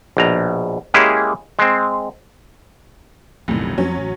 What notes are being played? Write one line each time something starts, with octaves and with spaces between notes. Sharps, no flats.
A#1 B2 A#5
G#3 A#3 C#4 E4 G4 G#4
G#3 C4
F1 B1 F2 A2 D#3
F2 F#3 C#4
A1